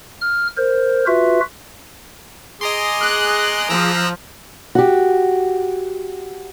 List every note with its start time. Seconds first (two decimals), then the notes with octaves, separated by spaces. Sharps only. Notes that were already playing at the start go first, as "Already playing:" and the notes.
0.21 F6
0.57 A#4 C5
1.07 F4 F#4 B4 E5
2.61 G#4 D#5 A#5 C6 D6
3.00 F#6
3.70 F3 A#5 E6 F#6
4.75 F#4 G4